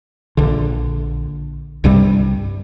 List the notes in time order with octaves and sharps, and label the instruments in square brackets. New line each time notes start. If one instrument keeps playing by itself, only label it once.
[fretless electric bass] A#1 D3
C2 G2 C3 G3